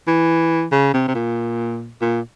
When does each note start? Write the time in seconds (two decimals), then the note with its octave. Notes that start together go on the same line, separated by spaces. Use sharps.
0.07 E3
0.72 C#3
0.94 C3
1.08 C3
1.15 A#2
2.01 A#2